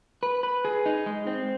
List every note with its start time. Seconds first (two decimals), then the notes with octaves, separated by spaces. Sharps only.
0.23 B4
0.43 B4
0.65 G#4
0.86 D#4
1.06 G#3
1.27 C4